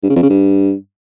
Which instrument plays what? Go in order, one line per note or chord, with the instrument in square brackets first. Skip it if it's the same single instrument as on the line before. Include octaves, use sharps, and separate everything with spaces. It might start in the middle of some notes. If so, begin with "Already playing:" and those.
[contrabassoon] G2
C#3
F2
C#3
G2